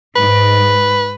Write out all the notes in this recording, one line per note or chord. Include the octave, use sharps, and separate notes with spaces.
G#2 B4